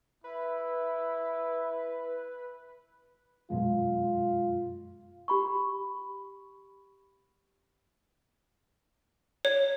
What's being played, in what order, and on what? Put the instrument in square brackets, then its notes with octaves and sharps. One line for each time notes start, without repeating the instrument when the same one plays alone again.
[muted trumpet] E4 [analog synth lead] B4
[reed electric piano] F#2 B2 G#3 [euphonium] F4
[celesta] G4 B5 C#6
[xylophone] C#5